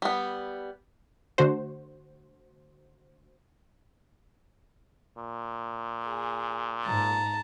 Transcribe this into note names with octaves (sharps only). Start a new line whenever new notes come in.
G3 B3
D3 A3 F#4 C5
A#2
G#4
G#2 A5 A#5